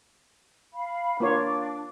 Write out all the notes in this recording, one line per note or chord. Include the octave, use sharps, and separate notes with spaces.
F5 B5
A#3 D4 F4 C#5 D6